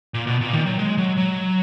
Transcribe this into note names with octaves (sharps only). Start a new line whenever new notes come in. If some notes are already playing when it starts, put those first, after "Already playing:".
A#2
B2
A#2
D#3
F#3
G#3
F#3
F#3